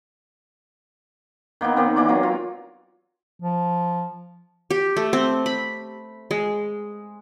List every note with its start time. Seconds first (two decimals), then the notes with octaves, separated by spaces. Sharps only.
1.61 D#3 A#3 B3 D#4
1.76 D#3 A#3 C4
1.96 E3 A#3 D5 D6
2.09 F#3 A#4
2.23 F4
3.42 F3
4.70 G4
4.96 A3
5.13 C4
5.46 B5
6.31 G#3